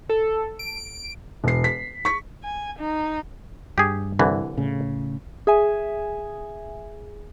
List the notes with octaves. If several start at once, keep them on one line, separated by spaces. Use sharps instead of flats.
A4
D7
E1 C7
B6
C#6 B6
G#5
D#4
G2 G4 G#4
C2 D3 E3
A2 C#3
G#4 E5 G#5